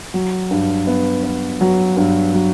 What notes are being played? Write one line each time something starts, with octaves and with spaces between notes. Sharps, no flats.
F#3
G2
B3
B3
F#3
G2
F#3